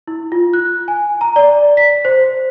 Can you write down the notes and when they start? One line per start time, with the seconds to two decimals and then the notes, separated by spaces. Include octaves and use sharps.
0.07 E4
0.32 F4
0.53 F#6
0.88 G#5
1.21 A#5
1.36 D5
1.77 B6
2.05 C5